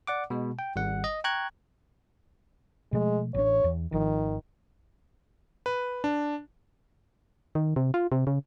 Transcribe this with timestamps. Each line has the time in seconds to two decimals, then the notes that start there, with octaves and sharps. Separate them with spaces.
0.07 D5 F#5 D6
0.30 B2 G#3
0.59 G5
0.76 G#1 G3 F#5
1.04 D#5
1.24 G5 A#5 C#6 F#6 G#6
2.93 B2 F3 G#3 A3
3.34 A1 D4 C#5
3.64 E2
3.92 G#1 D#3 F3
5.66 B4
6.04 D4
7.55 D#3
7.76 C3
7.94 F4
8.12 C3
8.27 C#3